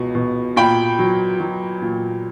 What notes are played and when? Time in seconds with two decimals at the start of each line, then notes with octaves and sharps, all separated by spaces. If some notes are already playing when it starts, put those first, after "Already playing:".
Already playing: C#2 B2
0.15 B2
0.56 A#2 G5 B5
0.99 F#3
1.40 F#3
1.82 A#2